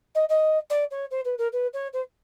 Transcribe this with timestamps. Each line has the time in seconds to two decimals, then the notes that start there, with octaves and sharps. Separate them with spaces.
0.15 D#5
0.29 D#5
0.70 D5
0.91 C#5
1.11 C5
1.25 B4
1.38 A#4
1.52 B4
1.73 C#5
1.93 C5